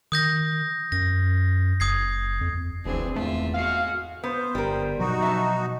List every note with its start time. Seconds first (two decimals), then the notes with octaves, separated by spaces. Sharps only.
0.12 D#3 D#6 G6 A#6
0.92 F#2 A#6
1.80 F#1 D#6 G#6 C7
2.41 F2
2.85 F1 D2 E3 C4 D4 G#4
3.16 G#1 E2 A3 F4 E5
3.54 G#3 F#4 F5
4.24 B3 C5
4.55 G1 G3 A#4
4.99 B2 F3 F#3 D#4 F#4
5.22 E5 A5